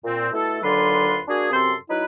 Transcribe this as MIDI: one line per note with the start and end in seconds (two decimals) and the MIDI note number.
0.04 0.29 46
0.04 0.29 60
0.33 0.58 47
0.33 0.58 57
0.33 0.58 64
0.33 0.58 69
0.63 1.20 39
0.63 1.20 50
0.63 1.20 54
0.63 1.20 65
0.63 1.20 71
0.63 1.20 84
1.28 1.51 58
1.28 1.51 62
1.28 1.51 66
1.28 1.51 68
1.52 1.74 42
1.52 1.74 48
1.52 1.74 60
1.52 1.74 69
1.52 1.74 84
1.89 2.04 54
1.89 2.04 63
1.89 2.04 64
1.89 2.04 71